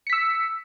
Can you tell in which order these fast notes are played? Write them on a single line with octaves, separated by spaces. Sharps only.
C#7 B6 E6